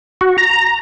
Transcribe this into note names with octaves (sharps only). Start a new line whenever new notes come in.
F#4
A#5